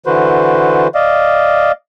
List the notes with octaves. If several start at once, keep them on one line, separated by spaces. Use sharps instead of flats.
D3 E3 F#4 B4 C5
D5 D#5 F5